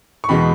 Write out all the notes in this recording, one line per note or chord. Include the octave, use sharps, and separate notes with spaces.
C#6
E2 B2 G#3 B5